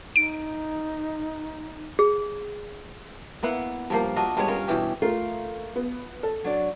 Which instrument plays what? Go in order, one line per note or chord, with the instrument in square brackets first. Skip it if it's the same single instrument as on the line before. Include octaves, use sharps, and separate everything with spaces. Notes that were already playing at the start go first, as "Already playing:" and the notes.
[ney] D#4 [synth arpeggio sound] D7
[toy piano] G#4
[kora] A#3 B3 E4 F#5
G2 F3 A#3
D4 F4 F#4 D#5
G2 G#3 B3 C#5
C#4 F4 A#4
B2 E3 G4
[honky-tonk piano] A3 A#4 [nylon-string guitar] F4
[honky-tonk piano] B3
A4
[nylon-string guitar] F#3 D4 D5